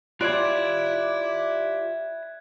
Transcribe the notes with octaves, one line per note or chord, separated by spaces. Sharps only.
F4 G4 D5 E5 B5 F#6 G#6